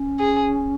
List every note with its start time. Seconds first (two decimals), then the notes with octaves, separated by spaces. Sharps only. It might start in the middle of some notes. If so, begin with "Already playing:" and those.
Already playing: C#4
0.19 G#4